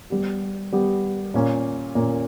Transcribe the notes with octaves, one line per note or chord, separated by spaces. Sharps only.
G3 B3 G4
G3 B3 G4
A#2 A#3 C#4
A#2 A#3 C#4